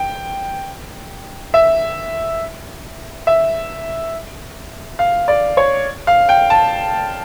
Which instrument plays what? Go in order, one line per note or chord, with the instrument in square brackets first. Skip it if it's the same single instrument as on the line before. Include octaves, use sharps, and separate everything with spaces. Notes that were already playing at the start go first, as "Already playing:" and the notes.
Already playing: [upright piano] G5
E5
E5
F5
D5
C#5
F5
G5
A5